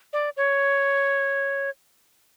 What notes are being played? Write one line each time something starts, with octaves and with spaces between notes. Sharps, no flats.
D5
C#5